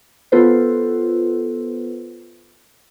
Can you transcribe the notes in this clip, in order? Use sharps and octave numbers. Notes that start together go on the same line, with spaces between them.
B3 F4 A4 B4 C5